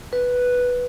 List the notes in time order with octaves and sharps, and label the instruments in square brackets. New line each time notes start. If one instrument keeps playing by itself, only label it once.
[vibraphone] B4